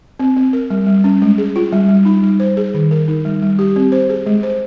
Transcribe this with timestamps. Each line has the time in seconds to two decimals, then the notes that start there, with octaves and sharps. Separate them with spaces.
0.19 C4
0.37 C4
0.53 A#4
0.70 G3
0.87 G3
1.04 C#4
1.22 G#3
1.38 G#4
1.56 F4
1.72 G3
1.88 G3
2.05 D#4
2.23 G3
2.40 C5
2.57 G#4
2.74 D#3
2.91 A#4
3.08 D#4
3.25 G3
3.42 G3
3.59 G4
3.76 C4
3.92 C5
4.09 G#4
4.26 G#3
4.43 C5